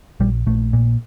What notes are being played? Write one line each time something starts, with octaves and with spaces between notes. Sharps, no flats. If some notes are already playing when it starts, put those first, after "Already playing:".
A#1 G3
A#1 A3
A#2